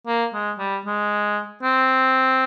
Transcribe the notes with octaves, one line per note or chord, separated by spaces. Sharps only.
A#3
G#3
G3
G#3
C4